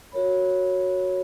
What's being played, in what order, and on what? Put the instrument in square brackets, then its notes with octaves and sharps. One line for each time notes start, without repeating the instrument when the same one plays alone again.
[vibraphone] F#4 A#4 C#5 B5